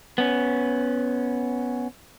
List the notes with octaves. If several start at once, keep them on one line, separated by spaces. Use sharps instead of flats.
B3 C#4